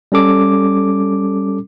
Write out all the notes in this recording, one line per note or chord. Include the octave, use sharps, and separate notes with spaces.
G3 C#4 A4 D6